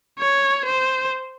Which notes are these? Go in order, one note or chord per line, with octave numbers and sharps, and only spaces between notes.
C#5
C5